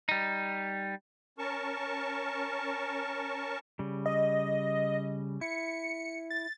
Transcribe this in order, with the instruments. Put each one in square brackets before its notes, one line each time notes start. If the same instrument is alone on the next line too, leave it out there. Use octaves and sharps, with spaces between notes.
[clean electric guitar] G3 D#4
[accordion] C#4 A#4 A5 C#6
[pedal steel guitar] C#3 G3
[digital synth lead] D#5
[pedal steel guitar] E4 [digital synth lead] C#7
[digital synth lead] A6